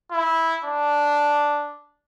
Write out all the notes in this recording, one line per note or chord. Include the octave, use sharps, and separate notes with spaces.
E4
D4